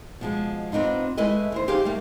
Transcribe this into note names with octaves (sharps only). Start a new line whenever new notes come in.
B2 F3 G#3
B3 C4 D4 D#4 F4
G#3 A3 E4 B4 D#5
D#2 C5
D#4 G4 G#4 C5 F5
G3 A3 A#3